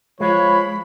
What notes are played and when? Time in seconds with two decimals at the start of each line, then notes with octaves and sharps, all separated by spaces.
0.20 F3 G#3 C#5 B5